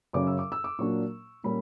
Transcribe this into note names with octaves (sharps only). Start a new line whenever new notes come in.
F#2 C#3 F#3 C#4 D6
E6
D6
E6
D6
A#2 F#3 A#3 D4 C#6
A#2 G3 A#3 C#4 B5